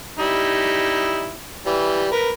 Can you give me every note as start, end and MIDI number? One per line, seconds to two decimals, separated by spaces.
0.19 1.35 55
0.19 1.35 63
0.19 1.35 64
1.66 2.09 52
1.66 2.09 55
2.12 2.30 70
2.12 2.30 71